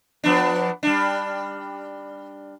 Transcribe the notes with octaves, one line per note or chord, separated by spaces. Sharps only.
F3 B3 D4
G3 D4